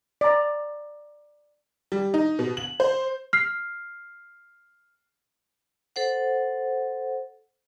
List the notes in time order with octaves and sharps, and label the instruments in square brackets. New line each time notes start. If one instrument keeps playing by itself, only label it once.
[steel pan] D5 A#5
[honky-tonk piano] G3
D#4
B2
F#7
C5
[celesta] F6 C7
[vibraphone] A4 C5 F#5